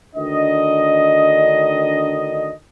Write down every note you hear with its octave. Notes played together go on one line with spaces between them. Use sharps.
D2 D#3 D4 D#5